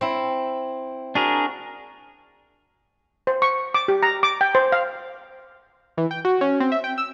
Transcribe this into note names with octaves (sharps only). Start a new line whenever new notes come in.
C4 E4
D4 F#4 G#4 A#4
C5
C#6
D6
G4
A#5
D6
G5
C5
F5
E3
G5
F#4
C#4
C4
E5
G5
E6